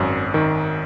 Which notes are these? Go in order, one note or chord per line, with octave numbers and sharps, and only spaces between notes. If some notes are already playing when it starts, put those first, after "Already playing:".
Already playing: G#1 F#2
D#3